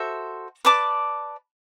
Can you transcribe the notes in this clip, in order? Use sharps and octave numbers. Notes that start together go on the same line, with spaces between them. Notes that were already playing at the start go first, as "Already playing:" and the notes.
Already playing: F#4 A4 C5 E5
B4 D5 A5 D6